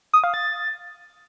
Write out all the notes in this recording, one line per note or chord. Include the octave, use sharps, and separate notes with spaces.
D#6
F5
A6